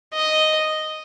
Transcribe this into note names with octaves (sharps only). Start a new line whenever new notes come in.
D#5